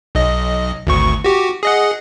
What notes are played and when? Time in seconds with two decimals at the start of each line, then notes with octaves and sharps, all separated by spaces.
0.15 B1 D#5
0.86 G#1 D2 C#6
1.24 F#4 G4
1.63 G#4 D#5 F#5